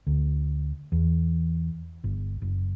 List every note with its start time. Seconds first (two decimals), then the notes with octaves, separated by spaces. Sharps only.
0.07 D2
0.92 E2
2.04 G1
2.42 F#1